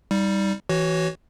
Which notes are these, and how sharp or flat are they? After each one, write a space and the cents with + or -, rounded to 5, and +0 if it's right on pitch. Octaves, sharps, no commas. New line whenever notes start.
G3 +0 D#4 +25
E3 +0 F#4 +25 C#5 +0